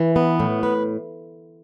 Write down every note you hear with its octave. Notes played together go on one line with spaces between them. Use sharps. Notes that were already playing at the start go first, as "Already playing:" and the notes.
Already playing: E3
B3
A2
B4